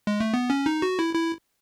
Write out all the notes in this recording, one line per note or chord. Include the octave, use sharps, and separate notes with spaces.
G#3
A3
B3
C#4
D#4
F#4
E4
E4